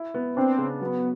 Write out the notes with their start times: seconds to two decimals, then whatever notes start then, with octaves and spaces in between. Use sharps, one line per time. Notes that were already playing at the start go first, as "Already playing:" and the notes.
Already playing: E4
0.14 B3
0.36 C4 D4
0.58 C#3
0.81 F#3 B3